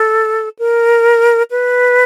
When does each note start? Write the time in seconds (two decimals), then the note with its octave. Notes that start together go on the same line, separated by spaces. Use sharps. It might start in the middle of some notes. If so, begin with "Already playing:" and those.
Already playing: A4
0.59 A#4
1.51 B4